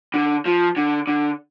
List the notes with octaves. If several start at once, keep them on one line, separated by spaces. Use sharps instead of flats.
D3
F3
D3
D3